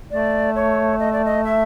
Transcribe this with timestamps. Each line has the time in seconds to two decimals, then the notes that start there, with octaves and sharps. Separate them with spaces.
0.11 A3 D5
0.55 C#5
1.00 D#5
1.13 D5
1.25 D#5
1.44 E5